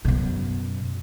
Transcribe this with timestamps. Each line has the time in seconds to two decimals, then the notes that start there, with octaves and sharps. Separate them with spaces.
0.05 F#2 B2